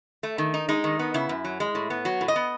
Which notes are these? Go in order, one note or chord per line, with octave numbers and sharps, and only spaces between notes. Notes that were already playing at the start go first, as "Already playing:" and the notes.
A3
D#3
D#4
G#3 D#4
D#3
B3
C#3 E4
F#2
F#3
G#3
A2
B3
F#3 F#4
A2
D#5
B3